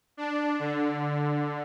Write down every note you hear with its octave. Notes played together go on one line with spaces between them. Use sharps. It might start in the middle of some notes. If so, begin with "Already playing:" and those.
D4
D3